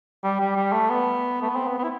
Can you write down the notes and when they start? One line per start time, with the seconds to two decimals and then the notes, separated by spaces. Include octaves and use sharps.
0.24 G3
0.40 G3
0.56 G3
0.72 A3
0.90 B3
1.42 A3
1.49 B3
1.56 C4
1.67 B3
1.78 B3
1.83 E4